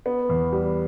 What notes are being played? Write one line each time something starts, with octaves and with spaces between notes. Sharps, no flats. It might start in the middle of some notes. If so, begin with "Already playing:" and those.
B3
E2
G3